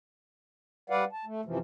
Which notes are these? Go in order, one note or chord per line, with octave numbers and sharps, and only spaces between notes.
G3 B4 D5 F5 F#5
A5
A3
F#2 C3 E3 F3